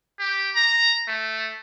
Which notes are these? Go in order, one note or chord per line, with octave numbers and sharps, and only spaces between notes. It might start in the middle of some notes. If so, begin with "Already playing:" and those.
G4
A#5
A3